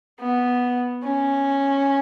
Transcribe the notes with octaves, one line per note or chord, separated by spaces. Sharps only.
B3
C#4